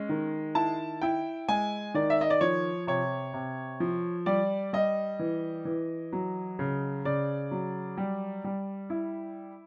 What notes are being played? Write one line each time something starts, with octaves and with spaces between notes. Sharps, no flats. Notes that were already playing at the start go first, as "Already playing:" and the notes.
Already playing: G#3 C#4
D#3
E4 A5
E4 G5
G#3 G#5
D#3 D5
E5
D#5
D5
F3 C#5
C3 C#5
C3
F3
G3 D5
G3 D#5
E3
E3
F#3
C#3
C#3 D5
F#3
G3
G3
E4